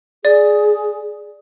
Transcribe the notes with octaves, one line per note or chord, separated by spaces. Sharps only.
G#4 D5